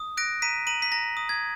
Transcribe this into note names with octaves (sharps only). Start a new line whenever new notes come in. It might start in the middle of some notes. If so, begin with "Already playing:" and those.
Already playing: D#6
F#6 A#6 D7
A#5 B6 D#7
A#5 D#7 F#7
B6
A#5 A#6
D#6
G#6